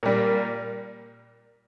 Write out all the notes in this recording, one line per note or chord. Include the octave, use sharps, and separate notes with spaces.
A#2 G3 A#3